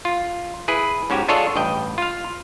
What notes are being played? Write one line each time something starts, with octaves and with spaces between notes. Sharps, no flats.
F4
E4 G#4 B4
G#2 C#4 F#4 G4 G#5
D4 F4 G#4 A4 C#5 D#5
A1 G2 D#5 G5
F4 F5